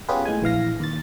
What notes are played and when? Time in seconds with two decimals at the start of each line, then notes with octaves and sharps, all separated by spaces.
0.09 B3 C#4 F4 G4 G#4 B4
0.25 A2 G#3 G#5
0.42 A#1 E3 F5 A#6
0.80 D#2 A6